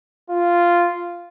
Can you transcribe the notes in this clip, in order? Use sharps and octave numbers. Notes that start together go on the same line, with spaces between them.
F4